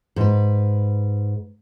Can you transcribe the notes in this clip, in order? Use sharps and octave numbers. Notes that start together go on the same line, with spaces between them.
G#2 B4